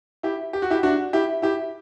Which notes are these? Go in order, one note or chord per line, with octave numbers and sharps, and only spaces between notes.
E4 G4
G4
F#4
E4 G4
D4 F#4
E4 G4
E4 G4